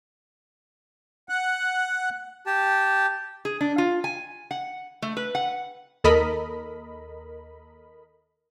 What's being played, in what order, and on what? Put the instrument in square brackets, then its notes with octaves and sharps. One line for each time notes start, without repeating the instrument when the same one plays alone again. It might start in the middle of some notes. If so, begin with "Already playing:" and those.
[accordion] F#5 F#6
[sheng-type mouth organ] G4 A5
[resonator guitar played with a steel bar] G#4
D4
F4
G#5
F#5
A3
B4
F#5
[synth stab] D#2 A4 A#4 D#5 B5